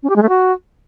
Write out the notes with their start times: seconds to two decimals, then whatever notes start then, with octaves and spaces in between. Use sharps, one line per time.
0.03 C#4
0.09 G4
0.16 G#3
0.22 A3
0.29 F#4